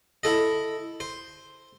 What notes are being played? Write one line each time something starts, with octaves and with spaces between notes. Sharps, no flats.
E4 A4 D#5
C5